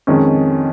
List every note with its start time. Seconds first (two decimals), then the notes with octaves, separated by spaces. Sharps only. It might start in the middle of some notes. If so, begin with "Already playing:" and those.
0.07 F2 D#3 G#3 C#4